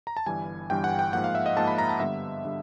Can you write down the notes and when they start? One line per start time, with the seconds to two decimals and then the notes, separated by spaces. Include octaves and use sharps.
0.07 A#5
0.17 A5
0.26 G1 G2 E3 G3 G#5
0.70 G1 G2 E3 G3 G5
0.84 F#5
0.99 G5
1.13 G#2 F3 A#3 F#5
1.24 F5
1.35 E5
1.46 D#5
1.56 G#2 F3 A#3 A5
1.67 B5
1.78 A#5
1.89 A5
2.00 G2 D3 G3 B3 E5
2.45 D3 G3